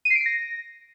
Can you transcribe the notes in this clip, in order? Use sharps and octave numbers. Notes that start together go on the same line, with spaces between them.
D#7
C7
D7
C7
A#6